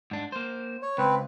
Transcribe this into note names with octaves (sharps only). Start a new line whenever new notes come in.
G#2 D4
A#3 C5
C#5
C#2 C4 B4